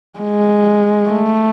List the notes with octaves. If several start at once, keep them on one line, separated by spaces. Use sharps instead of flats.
G#3
A3